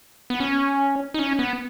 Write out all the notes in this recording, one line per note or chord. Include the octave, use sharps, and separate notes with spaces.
B3
C#4
D#4
C#4
B3